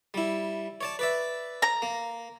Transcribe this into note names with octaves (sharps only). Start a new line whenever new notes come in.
G3 E4
C#5 D5 A5
B4 D5 E5
A#5
A#3